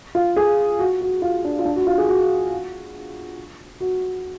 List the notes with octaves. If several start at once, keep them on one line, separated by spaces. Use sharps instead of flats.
F4
G#4
F#4
F#4
F4
D4
F4
D4
F#4
F4
G#4
F#4
F#4